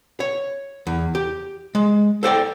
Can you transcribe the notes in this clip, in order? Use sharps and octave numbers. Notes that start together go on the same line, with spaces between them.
C#5
E2
G4
G#3
A4 C5 D5 G5